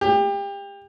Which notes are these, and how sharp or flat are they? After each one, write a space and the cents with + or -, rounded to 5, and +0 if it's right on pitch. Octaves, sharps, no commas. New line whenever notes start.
G4 +30